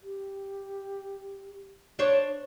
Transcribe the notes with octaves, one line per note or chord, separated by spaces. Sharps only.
G4
D4 C5 C#5